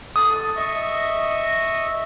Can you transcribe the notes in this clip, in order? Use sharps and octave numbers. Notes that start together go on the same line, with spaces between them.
A4 D#6
D#5 E5 C#6